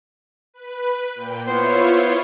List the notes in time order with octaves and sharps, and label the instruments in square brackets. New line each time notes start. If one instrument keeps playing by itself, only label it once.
[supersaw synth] B4
A#2 G5
[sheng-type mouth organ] B3 C5 C6 [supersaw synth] E4 F4 C#5